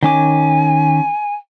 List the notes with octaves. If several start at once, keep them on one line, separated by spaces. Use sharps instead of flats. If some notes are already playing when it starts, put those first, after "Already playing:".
D#3 C#4 G#5 D6